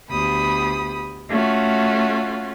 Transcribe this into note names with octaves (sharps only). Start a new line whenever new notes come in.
D2 B3 G4 B5 D#6
A3 C#4 F4 F#4